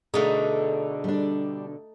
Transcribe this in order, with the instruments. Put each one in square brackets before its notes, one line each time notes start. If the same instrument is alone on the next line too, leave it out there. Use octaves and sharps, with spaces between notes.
[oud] B2 D3 [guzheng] A3 D#4 [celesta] G#4
[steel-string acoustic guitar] G3 D4